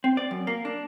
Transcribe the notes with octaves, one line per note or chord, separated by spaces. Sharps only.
C4
D5
F#2
A#3
D4